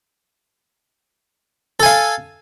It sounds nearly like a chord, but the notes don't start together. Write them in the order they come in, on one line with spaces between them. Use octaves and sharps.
A4 G#5 F5